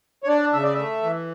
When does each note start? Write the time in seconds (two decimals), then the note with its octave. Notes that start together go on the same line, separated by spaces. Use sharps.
0.24 C#5
0.28 D4 D5
0.53 C#3 E5
0.64 D5
0.74 A3 E5
1.03 E3